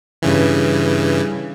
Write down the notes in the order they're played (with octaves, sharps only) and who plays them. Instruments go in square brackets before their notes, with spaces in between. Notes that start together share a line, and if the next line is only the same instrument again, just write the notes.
[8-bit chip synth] G2 C#3 E3